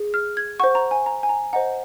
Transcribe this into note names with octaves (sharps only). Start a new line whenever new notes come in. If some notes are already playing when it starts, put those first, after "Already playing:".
Already playing: G#4
F6
G#6
C5 F#5 C#6
A#5
G#5
A#5
G#5
A#5
C5 D#5 F#5 A#5